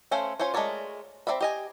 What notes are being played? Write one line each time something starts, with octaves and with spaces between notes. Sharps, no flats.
A3 C#4 C5 F5
C#4 F4 C5 C#5
G#3 A3 A#4 C#5 D5
C4 D#4 D5 E5 B5
G4 D#5 G#5